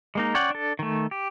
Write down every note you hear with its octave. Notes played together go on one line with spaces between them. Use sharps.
G#3 A#3 D#4
C#4 C#5 D5 F#5 G5
D4 A4
D#3 A3
G4